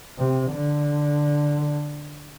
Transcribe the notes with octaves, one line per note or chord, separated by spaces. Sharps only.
C3
D3